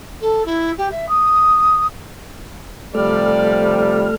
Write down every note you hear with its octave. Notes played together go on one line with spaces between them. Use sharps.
A4
E4
G4
E5
D#6
C3 F3 G3 A3 A4 D5 F6